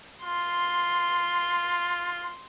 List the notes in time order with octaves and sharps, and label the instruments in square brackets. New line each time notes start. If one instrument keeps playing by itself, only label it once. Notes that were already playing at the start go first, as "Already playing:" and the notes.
[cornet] F4 [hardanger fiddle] C6